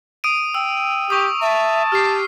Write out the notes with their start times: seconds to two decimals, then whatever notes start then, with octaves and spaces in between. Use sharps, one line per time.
0.24 D#6 D7 D#7
0.55 G5 E6
1.10 G4 C#6 D#6
1.41 E5 A5
1.92 G4 F6 C7